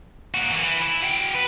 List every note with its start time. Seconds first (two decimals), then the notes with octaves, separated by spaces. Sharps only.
0.34 A#3 F#4
0.51 E3 A#3
0.64 E3
0.82 E4
1.02 F#3 G5
1.35 B4